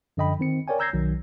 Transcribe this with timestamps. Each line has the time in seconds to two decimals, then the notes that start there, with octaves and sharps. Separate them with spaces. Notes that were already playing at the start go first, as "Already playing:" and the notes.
0.17 F#2 D3 F3 D#5 G5 B5
0.40 D#3 C4 C#7
0.68 A#4 C#5 D5 G5 G#5
0.79 A#5 E6 G6 G#6 A#6 C7
0.93 B1 D#3 F#3